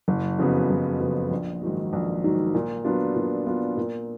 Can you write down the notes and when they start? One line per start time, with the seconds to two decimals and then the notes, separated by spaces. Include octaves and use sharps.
0.08 F#1
0.39 F2 C#3 F#3 B3
0.70 F#1
1.00 F2 C#3 F#3 B3
1.31 A#1
1.62 G#2 D#3 F#3
1.93 A#1
2.24 G#2 D#3 F#3
2.54 A#2
2.85 F#3 B3 D4 F4
3.16 A#2
3.47 F#3 B3 D4 F4
3.77 A#2